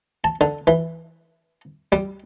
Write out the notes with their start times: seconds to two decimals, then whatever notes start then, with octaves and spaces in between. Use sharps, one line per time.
0.24 A5
0.41 D3
0.67 E3
1.92 G3